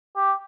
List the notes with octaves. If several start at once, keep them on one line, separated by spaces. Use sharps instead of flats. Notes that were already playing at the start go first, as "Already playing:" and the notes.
G4